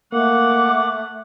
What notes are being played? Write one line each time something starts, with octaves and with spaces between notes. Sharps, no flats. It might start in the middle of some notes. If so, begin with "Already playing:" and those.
A3 A#3 F#5 D6